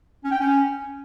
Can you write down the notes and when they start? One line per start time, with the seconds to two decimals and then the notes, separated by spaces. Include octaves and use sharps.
0.24 C#4
0.32 G5
0.40 C#4